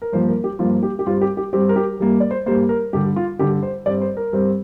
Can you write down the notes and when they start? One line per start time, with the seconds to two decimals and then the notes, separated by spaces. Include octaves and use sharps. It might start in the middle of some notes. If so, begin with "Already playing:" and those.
0.02 A#4
0.13 G2 F3 A#3 C5
0.28 A#4
0.44 G4
0.59 G2 F3 A#3 F4
0.83 G4
0.99 G4
1.06 G2 G3 C4 F4
1.21 G4
1.37 G4
1.53 G2 G3 C4 G4
1.69 A#4
1.76 G4
2.00 G2 G3 A#3
2.20 D5
2.31 C5
2.46 G2 G3 A#3 C5
2.69 A#4
2.93 G2 D3 G3 G4
3.16 F4
3.39 G2 D3 G3 G4
3.63 C5
3.86 G2 G3 C4 D5
4.01 C5
4.17 A#4
4.33 G2 G3 C4